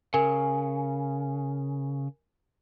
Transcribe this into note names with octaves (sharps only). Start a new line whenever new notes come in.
C#3 A#4 G#5